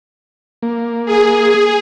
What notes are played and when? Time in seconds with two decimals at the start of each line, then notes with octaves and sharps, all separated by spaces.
0.63 A#3
1.06 G#4